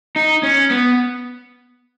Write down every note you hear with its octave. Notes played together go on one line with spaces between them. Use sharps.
D#4
C#4
B3